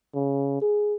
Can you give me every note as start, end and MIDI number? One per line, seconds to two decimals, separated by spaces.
0.15 0.58 49
0.62 0.95 68